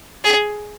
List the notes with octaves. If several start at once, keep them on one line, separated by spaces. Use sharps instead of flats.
G#4